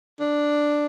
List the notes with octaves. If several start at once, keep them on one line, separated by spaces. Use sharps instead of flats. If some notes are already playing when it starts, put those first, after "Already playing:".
D4